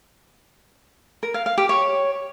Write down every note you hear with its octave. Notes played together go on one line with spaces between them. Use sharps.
A#4
F5
F5
G4
C#5